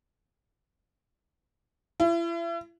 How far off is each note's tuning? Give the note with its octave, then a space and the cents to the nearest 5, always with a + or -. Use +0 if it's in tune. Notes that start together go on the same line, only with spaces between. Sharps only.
E4 +40